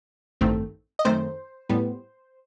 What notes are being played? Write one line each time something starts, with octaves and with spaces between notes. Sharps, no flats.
A1 G2 D#3 A3 C4
D#5
F#2 D#3 A3 C4 C5
A2 G3 B3